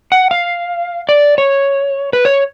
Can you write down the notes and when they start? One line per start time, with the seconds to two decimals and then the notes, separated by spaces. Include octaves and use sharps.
0.12 F#5
0.31 F5
1.09 D5
1.38 C#5
2.13 B4
2.25 C#5